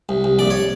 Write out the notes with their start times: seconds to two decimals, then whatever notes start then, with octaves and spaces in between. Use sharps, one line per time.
0.09 C2
0.24 C2
0.39 A#1 D5
0.50 C#5